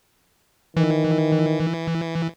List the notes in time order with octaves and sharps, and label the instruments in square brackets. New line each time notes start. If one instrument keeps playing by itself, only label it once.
[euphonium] D#3 [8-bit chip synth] E3